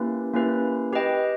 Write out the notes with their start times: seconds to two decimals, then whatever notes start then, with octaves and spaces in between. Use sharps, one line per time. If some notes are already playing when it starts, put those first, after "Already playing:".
Already playing: A#3 C#4 E4 G4 B4
0.34 A#3 C#4 E4 G4 B4
0.93 G4 B4 D#5 G5